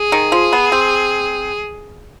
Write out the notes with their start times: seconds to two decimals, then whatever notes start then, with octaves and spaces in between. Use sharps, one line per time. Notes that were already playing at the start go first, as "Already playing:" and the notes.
Already playing: G#4
0.12 D#3
0.32 F3
0.53 B3
0.72 C4